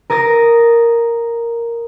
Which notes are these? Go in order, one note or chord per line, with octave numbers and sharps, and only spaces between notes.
A#4 D#6 A6 A#6